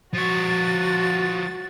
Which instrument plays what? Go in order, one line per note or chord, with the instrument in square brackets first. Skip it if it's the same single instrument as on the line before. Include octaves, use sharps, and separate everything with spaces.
[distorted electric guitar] F3 C#5 [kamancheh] F#4 [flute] A6